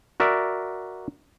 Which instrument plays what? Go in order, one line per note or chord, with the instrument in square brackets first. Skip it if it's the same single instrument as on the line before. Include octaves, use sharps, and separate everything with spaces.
[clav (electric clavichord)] F#4 A#4 D5 E5